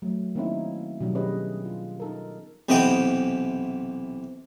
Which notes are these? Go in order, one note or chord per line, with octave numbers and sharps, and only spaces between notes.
F#3 A3
D#3 A#3 C4 C#4 D#4 E4
B2 D#3 F#3 G3 D4
C#4 G4 G#4 B4 D#5
F4
D#4 A4 A#4
B1 C3 E3 B3 D#5 G5